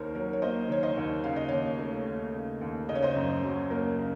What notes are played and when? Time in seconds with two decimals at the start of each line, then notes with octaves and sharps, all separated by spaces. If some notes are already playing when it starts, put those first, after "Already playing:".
Already playing: D#2 D#3 A#4 C5 C#5
0.15 F#3 A#4 C#5
0.33 C#5
0.42 A#3 C5 D#5
0.69 D#3 C#5
0.83 C5 D#5
0.97 D#2
1.24 C#3 F5
1.36 D#5
1.48 D#2 C#5 F5
1.79 A3
2.07 D#2
2.34 C#3
2.61 D#2
2.89 C#3 D#5
2.95 C#5
3.02 C5 D#5
3.15 F#2
3.43 F#3
3.70 A#3 A#4 C#5
3.98 C#3